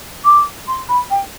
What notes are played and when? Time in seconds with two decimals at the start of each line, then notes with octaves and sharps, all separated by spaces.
0.24 D6
0.67 C6
0.89 B5
1.10 G5